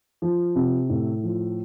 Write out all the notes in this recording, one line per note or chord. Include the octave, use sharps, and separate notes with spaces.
F3
C3
A2
F3